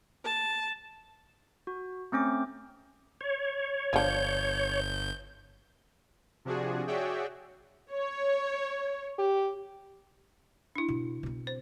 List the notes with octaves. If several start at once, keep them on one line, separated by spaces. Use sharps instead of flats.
A5
F#4
A3 C4 C#4 D6
C#5
G1 F3 D4 G6
C3 F3 D4 F#4 G#4
F#4 G#4 C#5 D5 E5 G5
C#5
G4
D4 E4
B2
B2 C4
C5